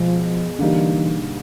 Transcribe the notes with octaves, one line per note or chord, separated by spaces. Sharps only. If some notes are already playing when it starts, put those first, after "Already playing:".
Already playing: B2 F3 G#3 F4
D3 E3 G3 A#3 D#4